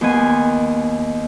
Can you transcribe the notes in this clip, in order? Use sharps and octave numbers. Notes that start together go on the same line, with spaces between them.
D#2 B3 G#5 C6